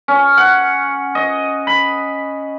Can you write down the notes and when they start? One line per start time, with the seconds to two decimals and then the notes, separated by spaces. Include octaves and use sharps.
0.08 C#4
0.37 F#5
1.15 D#5
1.67 B5